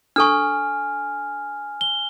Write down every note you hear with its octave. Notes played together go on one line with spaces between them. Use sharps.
D4 A4 G#5 C#6 F6
G7